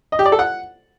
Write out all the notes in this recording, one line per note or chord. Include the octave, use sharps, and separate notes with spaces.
D#5
G4
D5
A4
F#5